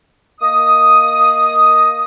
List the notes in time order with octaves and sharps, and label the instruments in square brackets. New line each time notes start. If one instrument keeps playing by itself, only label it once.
[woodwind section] A#3 D#5 D#6